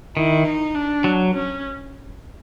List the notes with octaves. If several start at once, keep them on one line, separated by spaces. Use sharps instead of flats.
D#3 E4
D#4
D4
F#3
C#4